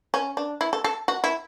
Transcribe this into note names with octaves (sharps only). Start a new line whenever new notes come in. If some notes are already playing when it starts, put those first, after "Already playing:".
C#4
D4
E4
A4
A4
F#4
E4